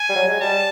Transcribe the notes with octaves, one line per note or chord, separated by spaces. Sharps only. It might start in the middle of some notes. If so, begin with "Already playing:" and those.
Already playing: G#5
G3
F#3
G#3
G3 A5